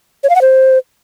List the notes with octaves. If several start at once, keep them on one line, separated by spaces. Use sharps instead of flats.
C#5
F5
F#5
C5